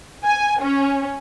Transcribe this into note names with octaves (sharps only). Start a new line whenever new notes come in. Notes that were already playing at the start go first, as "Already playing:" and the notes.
G#5
C#4